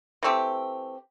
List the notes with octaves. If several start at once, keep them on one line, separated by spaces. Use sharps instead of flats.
E3 A3 C4 G4